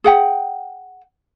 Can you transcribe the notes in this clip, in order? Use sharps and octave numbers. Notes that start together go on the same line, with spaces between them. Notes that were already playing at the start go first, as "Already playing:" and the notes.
G#4 F#5 G5